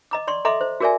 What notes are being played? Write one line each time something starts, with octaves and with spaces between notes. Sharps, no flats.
D#5 A#5 D6
D5 C6 C#6
A4 D#5 E5 A#5 C6 D6
C5
F#4 G#4 A#4 D5 E5 G#5